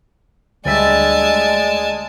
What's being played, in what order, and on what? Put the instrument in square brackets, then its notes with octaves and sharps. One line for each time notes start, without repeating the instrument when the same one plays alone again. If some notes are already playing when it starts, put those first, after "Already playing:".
[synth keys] D2 G3 E5 [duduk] G#3 [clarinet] D5 [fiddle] G#5 A5